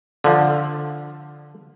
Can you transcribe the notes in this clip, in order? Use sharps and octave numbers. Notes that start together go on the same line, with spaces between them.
D3 F3